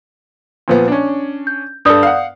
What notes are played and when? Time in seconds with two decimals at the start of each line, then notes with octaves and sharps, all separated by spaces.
0.68 A#2 F3 B3
0.88 C#4 D4
1.47 G6
1.85 G2 A4 D5 D#6 G6
2.03 F5 F#5